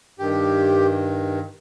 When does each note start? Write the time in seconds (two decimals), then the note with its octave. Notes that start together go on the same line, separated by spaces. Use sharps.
0.19 G2 D#3 G4